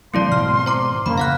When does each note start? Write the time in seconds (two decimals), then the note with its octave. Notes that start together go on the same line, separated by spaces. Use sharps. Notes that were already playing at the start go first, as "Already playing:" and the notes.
0.14 E3 F#3 A3 C4 E4 D5 C6
0.32 G#2 B2 D#3 F6
0.66 C5 A#5 D6
1.06 F2 C#3 A#3 B5
1.18 F5 F#5 F#6